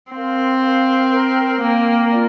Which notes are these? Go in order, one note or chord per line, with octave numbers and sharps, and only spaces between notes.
C4 A#4 F5 C6
A#4 F5 C6
A#4 G5 A#5
A#3 A#4 G5 A#5
F4 A#4 D5